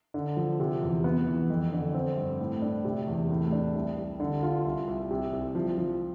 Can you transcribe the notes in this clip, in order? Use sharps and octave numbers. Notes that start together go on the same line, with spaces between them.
D3
F3
C3
E2
B3
E3
F2
D3
C4
G2
A2
D4
C3
E2
A2
D4
C2
G3
D3
F4
C2
C2
C3
C2
F3
F3